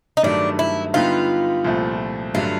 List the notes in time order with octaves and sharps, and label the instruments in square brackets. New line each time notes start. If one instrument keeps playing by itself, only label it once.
[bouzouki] D#4
[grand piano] G2 D#3 F#3 A3 [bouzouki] D4
[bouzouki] E4
[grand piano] D3 G3 B3 D#4 G4 [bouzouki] F4
[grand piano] C2 A#2 F3 A3
[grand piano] G2 D3 F#3 A3 D4 [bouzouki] F4